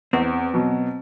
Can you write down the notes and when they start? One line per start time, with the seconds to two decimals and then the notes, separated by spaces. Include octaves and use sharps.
0.13 E2 C4
0.54 B2 F#3